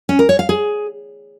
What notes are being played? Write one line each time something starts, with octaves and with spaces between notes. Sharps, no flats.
C#4
A#4
C#5
F5
G#4